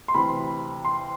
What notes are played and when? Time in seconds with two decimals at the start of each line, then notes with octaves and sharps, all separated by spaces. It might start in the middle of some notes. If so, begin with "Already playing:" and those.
0.08 C6
0.14 D2 C3 E3 B5
0.85 C6